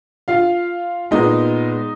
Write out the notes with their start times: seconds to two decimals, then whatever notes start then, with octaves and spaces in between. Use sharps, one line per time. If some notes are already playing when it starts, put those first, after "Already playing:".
0.28 F4 F5
1.11 A#2 G#3 B3 D#4 D#5